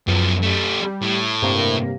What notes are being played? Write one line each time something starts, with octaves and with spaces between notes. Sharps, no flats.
F#2 F3 B3
A3 G4
G3
A2
G2 C3 A#3